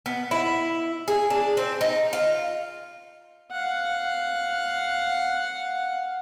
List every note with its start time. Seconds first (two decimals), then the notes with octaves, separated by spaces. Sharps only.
0.06 B3
0.31 E4
1.08 G#4
1.30 D4
1.57 C4
1.81 D#4
2.13 F4
3.51 F5 F#5